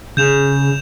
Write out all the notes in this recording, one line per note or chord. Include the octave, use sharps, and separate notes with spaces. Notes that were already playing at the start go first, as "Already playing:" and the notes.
C#3 G6 E7 F7